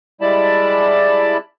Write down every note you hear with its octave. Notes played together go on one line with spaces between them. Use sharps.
G3 G#3 E4 D5 A5 B5